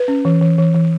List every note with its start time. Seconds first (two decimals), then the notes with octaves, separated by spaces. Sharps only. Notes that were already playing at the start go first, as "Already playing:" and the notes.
Already playing: B4
0.08 C#4
0.25 E3
0.41 E3
0.58 E3
0.75 E3